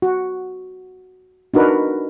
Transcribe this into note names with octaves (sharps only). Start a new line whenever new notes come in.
F#4
D4 D#4 F#4 A#4 B4